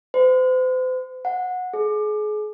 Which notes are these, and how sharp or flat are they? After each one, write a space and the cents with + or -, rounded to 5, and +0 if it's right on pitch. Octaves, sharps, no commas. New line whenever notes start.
C5 -40
F#5 -20
G#4 +30